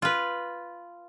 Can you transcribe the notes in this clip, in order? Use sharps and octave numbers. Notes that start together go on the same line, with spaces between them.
F4 B4